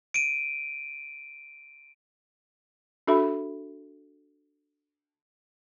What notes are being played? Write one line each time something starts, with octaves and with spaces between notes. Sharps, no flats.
D7 D#7
D4 F#4 A4 E5 B5